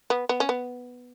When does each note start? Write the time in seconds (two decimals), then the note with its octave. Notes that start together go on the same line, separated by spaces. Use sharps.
0.10 B3
0.29 B3
0.40 C#4
0.49 B3